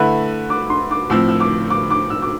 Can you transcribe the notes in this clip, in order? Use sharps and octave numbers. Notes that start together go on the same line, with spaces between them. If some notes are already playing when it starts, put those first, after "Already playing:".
Already playing: D3 A3 E4 B4
D6
C6
D6
A2 F3 C4 E6
E6
D6
D6
D6
E6
D6